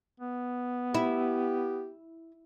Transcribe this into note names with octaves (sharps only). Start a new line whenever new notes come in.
B3
E4 G4